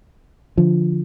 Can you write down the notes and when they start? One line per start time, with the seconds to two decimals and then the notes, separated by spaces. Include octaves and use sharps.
0.58 D3 F3